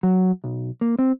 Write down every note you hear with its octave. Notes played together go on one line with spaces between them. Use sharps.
F#3
B1
A#3
C4